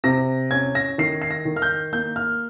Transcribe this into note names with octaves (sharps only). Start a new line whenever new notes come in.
C3 A#6
C#4 G#6
A#6
D#3 C7
C7
A#6
D#3
F6
G6
A#3 G6
F6